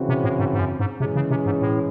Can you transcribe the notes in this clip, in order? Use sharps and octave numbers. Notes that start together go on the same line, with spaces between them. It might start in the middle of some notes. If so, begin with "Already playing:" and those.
Already playing: C#3 E3 C4 F#4
C3
A2
G#2
G#2
F#2
G#2
C3 E3 G#3 C#4 G#4
C#3
C3
G#2
A2